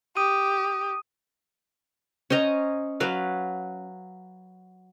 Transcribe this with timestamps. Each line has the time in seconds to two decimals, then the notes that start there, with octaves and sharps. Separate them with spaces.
0.17 G4 D#6 D#7
2.30 C#4 C5 D#5 A#5
3.00 F#3 B4 F5